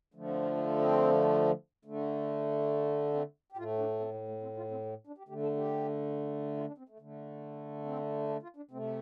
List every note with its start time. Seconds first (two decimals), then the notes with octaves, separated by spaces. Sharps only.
0.14 D3 F3 A3
0.28 C4
0.42 F4
0.57 D4
0.79 C4
1.85 D3 A3
3.14 C4
3.52 G4
3.57 A2 A3 F4
3.78 D4
4.00 C4
4.14 A3
4.28 A3
4.43 C4
4.57 F4
4.71 C4
4.86 A3
5.07 D4
5.18 G4
5.28 D3 A3 G4
5.43 A4
5.57 G4
6.57 F4
6.67 D4
6.78 C4
6.89 A3
7.00 D3 A3
7.85 C4
8.29 D4
8.43 F4
8.56 D4
8.71 C3 A3 C4